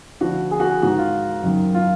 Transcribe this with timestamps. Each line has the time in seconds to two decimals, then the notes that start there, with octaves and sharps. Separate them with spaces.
0.21 D2 D3 F3 F#4
0.51 G#4
0.60 F#4
0.67 G#4
0.82 G#2 D#3 F#4
0.98 F4
1.43 F#2 D#3
1.74 F4